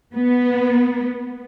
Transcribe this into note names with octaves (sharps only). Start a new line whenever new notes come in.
B3